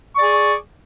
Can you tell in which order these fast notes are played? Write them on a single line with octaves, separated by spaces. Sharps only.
C#6 D5 G#4